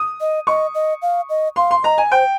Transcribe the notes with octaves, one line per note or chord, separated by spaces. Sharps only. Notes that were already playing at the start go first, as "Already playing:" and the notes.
Already playing: D#6
D#5
D#5 C#6
D#5
F5
D#5
F5 C6
C6
D#5 A#5
G#5
C5 G5